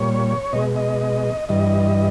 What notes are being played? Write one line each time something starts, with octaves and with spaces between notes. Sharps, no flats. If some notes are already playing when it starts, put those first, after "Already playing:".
Already playing: A#2 G3 C#5
B2 G#3 D#5
D#5
D#5
G2 E3 G3 D#5